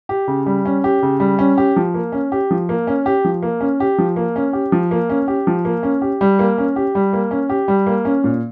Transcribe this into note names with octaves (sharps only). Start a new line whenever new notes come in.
G4
C#3
G3
C#4
G4
C#3
G3
C#4
G4
F3
A#3
C#4
G4
F3
A#3
C#4
G4
F3
A#3
C#4
G4
F3
A#3
C#4
G4
F3
A#3
C#4
G4
F3
A#3
C#4
G4
G3
A#3
C#4
G4
G3
A#3
C#4
G4
G3
A#3
C#4
A#2